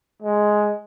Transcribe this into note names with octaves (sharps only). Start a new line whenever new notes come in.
G#3